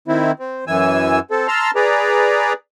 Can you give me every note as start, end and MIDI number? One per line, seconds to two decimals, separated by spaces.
0.08 0.32 51
0.08 0.32 60
0.08 0.32 64
0.39 0.65 60
0.67 1.19 42
0.67 1.19 52
0.67 1.19 80
0.67 1.19 88
1.31 1.47 60
1.31 1.47 69
1.48 1.71 81
1.48 1.71 82
1.48 1.71 84
1.48 1.71 88
1.48 1.71 89
1.76 2.53 68
1.76 2.53 71
1.76 2.53 74
1.76 2.53 82